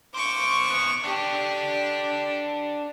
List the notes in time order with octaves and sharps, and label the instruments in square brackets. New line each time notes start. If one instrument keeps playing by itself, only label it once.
[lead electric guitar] A#3 C5 [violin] C#6 D6
[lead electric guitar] D#3 B3
[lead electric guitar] D4 A4 [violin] G4